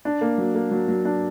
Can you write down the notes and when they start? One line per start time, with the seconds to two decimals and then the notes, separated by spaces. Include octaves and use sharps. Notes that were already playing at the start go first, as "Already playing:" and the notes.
0.05 D4
0.21 A#3
0.38 F#3
0.55 A#3
0.71 F#3
0.88 F#3
1.05 D4